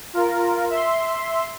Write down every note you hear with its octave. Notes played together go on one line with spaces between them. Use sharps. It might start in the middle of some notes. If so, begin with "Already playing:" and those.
F4 A#4
E5 C6